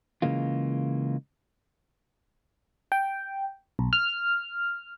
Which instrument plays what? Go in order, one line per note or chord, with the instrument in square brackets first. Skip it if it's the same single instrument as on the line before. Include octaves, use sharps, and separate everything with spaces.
[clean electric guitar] C#3 E3 G#3 A#3 F4
[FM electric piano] G5
B1
F6